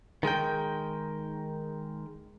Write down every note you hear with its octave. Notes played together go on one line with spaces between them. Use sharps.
D#3 G#3 A#4 G5